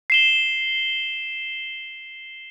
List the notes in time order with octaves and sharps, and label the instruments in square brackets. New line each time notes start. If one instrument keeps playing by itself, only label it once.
[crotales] C7 E7 G7